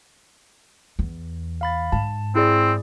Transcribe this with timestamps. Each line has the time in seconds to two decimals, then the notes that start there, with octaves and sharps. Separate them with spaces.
0.99 E2
1.61 F5 B5 A6
1.92 G#2 A5
2.35 C4 E4 G#4 D5